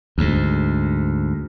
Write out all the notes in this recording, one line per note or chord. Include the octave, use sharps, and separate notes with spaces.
D2 G#2